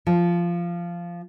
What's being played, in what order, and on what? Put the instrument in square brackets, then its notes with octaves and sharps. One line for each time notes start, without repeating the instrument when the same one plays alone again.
[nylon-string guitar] F3